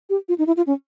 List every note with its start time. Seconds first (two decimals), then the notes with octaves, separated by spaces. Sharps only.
0.10 G4
0.29 F4
0.38 D#4
0.47 E4
0.57 F4
0.67 C#4